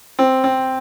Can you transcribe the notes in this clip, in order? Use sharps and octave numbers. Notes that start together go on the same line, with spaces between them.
C4
C4